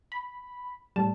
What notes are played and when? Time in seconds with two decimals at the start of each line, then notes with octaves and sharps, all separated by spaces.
0.12 B5
0.96 A2 G3 A5